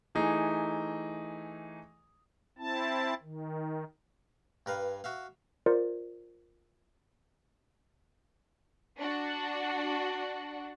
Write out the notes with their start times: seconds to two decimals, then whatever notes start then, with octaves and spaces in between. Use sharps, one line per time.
0.15 E3 A3 D#4 G#4
2.58 C4 E4 A5
3.22 D#3
4.66 G2 A#4 B4 F5
5.04 F#4 E5 F5
5.66 F4 A#4 C5 D5
8.98 D4 F#4